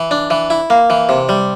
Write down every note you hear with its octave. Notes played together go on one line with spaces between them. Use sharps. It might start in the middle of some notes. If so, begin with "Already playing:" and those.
Already playing: E3
D4
E3
E4
A#3
E3
C3
G3